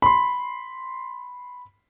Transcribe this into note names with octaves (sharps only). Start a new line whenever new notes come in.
B5 C6